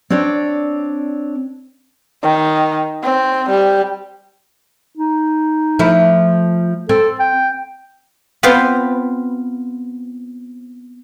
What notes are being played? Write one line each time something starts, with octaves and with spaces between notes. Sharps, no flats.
C4 D4 C#5 D5
D#3
C4
G3
D#4
F3 A3 E4
C4 A4
G5
B3 C4 F4 B4 C5